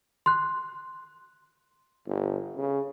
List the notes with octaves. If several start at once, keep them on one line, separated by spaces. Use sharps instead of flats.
C6 F#6
G1
C#3